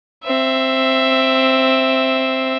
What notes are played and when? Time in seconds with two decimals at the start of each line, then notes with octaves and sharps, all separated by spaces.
0.25 C4 E5